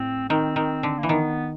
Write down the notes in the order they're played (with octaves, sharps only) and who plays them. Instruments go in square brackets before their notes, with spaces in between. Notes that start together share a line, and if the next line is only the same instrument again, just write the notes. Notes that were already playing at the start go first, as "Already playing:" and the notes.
Already playing: [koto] A2 [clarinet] C4
[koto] D#3 [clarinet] C4
[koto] D#3
D3
[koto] E3 [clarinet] A#3
[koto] D#3 [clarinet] B3